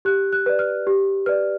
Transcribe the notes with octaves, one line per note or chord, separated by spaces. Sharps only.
G4 F#6
F#6
B4 D5
F6
G4
B4 D5 F6